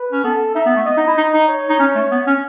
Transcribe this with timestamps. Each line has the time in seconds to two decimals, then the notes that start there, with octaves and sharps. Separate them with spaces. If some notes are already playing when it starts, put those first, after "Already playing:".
Already playing: B4
0.12 C#4
0.24 B3 A4
0.55 D#4 E5
0.66 B3
0.76 A3
0.86 B3 D#5
0.97 D#4
1.07 E4
1.17 D#4
1.33 D#4
1.48 C#5
1.69 D#4
1.79 C#4
1.95 A3
2.11 B3
2.27 C#4